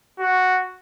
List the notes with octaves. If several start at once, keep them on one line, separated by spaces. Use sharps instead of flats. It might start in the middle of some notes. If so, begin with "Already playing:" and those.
F#4